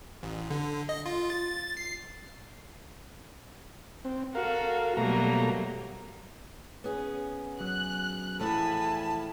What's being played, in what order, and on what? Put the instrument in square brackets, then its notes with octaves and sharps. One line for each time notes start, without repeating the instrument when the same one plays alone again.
[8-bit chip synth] A1
D3
D#5
F4
A6
C7
[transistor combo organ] C4
[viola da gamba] F#4 A4 [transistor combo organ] A#4 F5
[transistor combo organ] B2 A3 A#5 [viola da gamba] F#3 G3 A#3
[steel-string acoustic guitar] B3 C#4 G#4
[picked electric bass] F#3 [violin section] F#6
[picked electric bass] E2 [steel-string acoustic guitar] A2 F3 A3 [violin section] G#5 B5 [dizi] A5